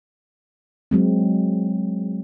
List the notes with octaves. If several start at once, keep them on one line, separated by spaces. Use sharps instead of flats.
F#3 G#3 C4